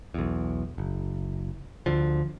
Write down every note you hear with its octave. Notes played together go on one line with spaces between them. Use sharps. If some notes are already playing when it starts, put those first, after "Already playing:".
B1 E2
F#1
D2 D3 F3